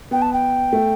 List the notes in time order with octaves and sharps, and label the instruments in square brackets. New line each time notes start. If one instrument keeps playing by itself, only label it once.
[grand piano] B3 [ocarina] G5
[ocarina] A5
G5
[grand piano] A3